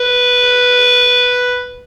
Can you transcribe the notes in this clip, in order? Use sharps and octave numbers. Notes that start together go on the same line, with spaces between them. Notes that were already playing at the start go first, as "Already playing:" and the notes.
Already playing: B4